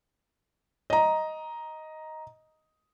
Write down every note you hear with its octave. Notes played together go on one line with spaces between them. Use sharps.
D#5 A#5